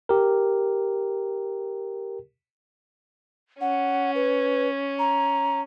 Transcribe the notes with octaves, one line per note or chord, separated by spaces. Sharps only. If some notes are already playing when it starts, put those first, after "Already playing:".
G4 A#4
C#4 F#5
B4
A#5